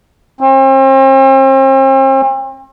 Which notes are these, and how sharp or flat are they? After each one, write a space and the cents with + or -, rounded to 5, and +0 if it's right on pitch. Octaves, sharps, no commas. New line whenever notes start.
C4 +40